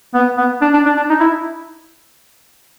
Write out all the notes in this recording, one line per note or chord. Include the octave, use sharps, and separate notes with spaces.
B3
B3
D4
D4
D4
D4
D#4
E4